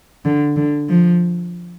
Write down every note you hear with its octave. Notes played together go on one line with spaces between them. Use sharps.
D3
D3
F3